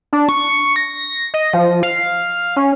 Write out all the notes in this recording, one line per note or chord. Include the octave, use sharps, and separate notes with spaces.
D4
C#6
A#6
D#5
F3
F5
C#4